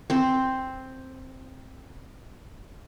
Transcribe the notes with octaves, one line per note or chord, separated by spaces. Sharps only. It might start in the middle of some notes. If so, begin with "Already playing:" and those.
C4 C5